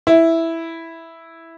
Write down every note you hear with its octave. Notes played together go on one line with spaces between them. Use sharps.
E4